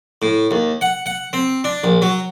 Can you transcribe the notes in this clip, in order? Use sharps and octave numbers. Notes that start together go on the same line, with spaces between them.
A2
D#2
F#5
F#5
C4
D4
A#1
F#3